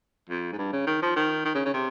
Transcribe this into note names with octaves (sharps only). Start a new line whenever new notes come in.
F2
G#2
G2
C#3
D#3
F3
D#3
D#3
C#3
C#3
C3